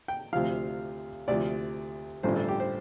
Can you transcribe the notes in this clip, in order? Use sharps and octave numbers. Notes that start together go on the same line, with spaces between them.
G5
D2 C3 F3 F5
D2 C3 F3 D5
A1 G2 D3 F3 C5
A4
G4
C5